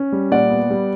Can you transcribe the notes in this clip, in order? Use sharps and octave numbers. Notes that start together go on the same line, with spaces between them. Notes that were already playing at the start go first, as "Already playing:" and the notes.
Already playing: C#4
G3
A#2 D5 F#5
B3
G3